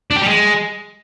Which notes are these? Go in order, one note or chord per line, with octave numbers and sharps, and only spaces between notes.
D4
G4
G3
G#3